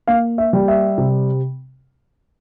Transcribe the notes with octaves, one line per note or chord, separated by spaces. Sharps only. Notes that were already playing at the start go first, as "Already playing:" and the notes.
A#3 F5
E5
G3
E5
C3